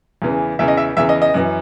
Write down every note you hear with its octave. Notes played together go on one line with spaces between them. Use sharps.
E2 C#3 E3
E2 C#3 E3 E5
D#5
E5
E2 C#3 E3 E5
D#5
D#5
F#2 E3